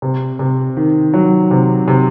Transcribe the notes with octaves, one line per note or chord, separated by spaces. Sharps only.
C3
C3
D#3
F#3
C3
C3